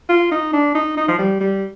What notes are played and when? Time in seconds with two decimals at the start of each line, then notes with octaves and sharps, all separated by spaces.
0.09 F4
0.31 D#4
0.53 D4
0.75 D#4
0.97 D#4
1.08 F3
1.18 G3
1.40 G3